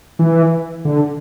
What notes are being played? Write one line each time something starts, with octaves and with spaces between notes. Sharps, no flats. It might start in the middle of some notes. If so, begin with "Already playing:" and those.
E3
D3